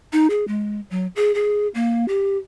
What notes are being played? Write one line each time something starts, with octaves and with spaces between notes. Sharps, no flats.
D#4
G#4
G#3
F#3
G#4
G#4
A#3
G4